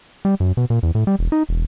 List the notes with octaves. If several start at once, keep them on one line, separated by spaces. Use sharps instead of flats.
G3
F#2
B2
A#2
E2
A2
G3
E1
D#4
E1